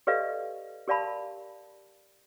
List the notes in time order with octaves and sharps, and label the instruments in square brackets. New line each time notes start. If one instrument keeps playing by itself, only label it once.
[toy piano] G4 A4 B4 D5 D#5 F5
G4 A#4 D5 F5 A5 B5